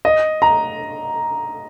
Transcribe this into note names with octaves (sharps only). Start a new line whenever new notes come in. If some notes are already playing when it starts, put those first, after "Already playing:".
D#5
A#5